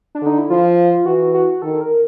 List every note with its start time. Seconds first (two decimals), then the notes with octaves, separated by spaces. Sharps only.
0.15 D4
0.22 D3 D#4
0.38 E4
0.50 F3 F4
1.05 E3 F#4
1.34 F#4
1.62 D#3 A4
1.81 A#4